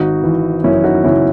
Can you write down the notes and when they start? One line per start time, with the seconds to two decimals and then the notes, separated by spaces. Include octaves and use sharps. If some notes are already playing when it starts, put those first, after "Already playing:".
Already playing: G#1 D#4 F#4
0.23 E3
0.64 F#2 C#4 E4
0.84 D#4 F#4
1.04 C#3 C#4 E4